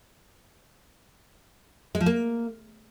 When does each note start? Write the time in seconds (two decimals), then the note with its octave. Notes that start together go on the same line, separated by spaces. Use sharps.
1.95 G#3
2.00 F3
2.06 A#3